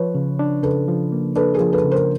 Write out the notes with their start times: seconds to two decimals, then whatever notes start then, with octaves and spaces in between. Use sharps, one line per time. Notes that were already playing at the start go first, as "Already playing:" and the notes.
Already playing: F3 B4 C#5
0.15 C#3
0.39 D4
0.63 C#3 A4 B4
0.88 F3
1.12 A#3
1.36 D4 A4 B4
1.54 G#4 A#4
1.61 F3
1.73 A4 B4
1.84 C#3
1.91 A#4 C5